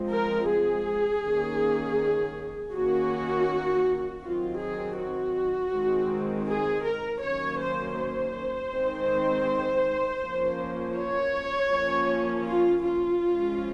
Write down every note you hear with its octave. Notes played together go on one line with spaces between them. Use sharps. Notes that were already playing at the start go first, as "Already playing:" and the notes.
Already playing: F3 G#3 C4
A#4
G#4
D#3 A#3 C#4
D#3 A#3 C#4 F#4
D#3 F#3 C4 F4
G#4
F#4
D#3 G#3 C4
G#4
A#4
D#3 F#3 A#3 C#4 C#5
C5
C5
D#3 G#3 C4
F3 A#3 C#4
C#5
F3 A#3 C#4
F4
F4
F3 G#3 C#4